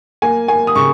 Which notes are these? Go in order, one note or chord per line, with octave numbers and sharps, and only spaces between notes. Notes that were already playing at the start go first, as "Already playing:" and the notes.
A#3 G#5
A#3 G#5
D#6
C#3 C#6